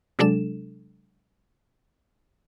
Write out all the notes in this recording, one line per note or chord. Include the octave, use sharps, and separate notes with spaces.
C3 F#3 G#3 D4 A4 E7